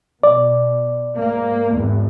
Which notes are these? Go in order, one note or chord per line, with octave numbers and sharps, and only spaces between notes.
B2 D5
G#2 A#3
G#1 E2